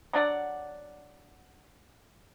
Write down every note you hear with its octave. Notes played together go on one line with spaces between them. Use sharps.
F#3 D4 D5 F#5